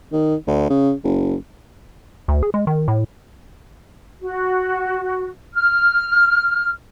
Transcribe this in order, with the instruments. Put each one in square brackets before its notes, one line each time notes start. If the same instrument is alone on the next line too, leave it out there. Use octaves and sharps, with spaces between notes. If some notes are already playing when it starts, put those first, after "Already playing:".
[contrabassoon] D#3
D2
C#3
F#1
[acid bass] D2
G#4
G#3
D#3
A2
[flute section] F#4
F6